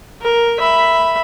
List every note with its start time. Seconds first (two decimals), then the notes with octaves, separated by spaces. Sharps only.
0.22 A#4
0.59 E5 B5